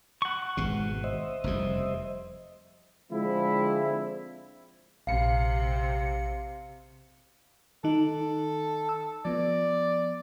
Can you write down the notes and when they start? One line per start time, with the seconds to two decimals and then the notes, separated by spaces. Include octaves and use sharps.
0.22 F#5 C#6
0.57 G#1 B2 G#3
1.04 C5 D#5 E5
1.44 F1 E2 G3
3.11 D3 F3 G#3 C4 D4 E4
5.07 A#1 C3 F5 C#7
7.84 D#3 D#4 A4
8.89 E6
9.25 F3 B3 D5